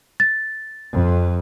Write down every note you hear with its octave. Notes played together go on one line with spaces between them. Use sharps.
A6
F2